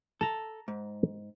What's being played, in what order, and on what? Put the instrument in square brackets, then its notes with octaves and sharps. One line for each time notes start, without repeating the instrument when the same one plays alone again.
[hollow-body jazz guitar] A4 [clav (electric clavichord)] A5 A#5
[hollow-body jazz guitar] G#2